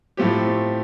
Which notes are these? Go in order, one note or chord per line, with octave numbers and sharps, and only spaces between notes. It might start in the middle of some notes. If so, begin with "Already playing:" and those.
A2 F3 A3 C4 G4